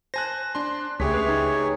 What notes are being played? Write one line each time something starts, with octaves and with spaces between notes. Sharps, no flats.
C5 G#5 A5 F#6 A#6
D4 C6
C#2 A3 C#4 G4 G#4 C#5 B6
B4
D#4